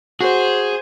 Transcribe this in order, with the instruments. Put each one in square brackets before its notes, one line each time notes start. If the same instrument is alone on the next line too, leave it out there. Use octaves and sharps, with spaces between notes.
[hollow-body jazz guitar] F#4 [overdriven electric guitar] G#4 [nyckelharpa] C5